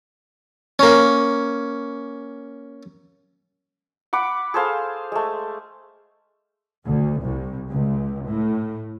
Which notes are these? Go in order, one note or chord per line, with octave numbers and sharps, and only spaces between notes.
A#3 C#4
F#5 B5 D6
G#4 A4 C5 F5
G#3 A3
D2
C2
C#2
A2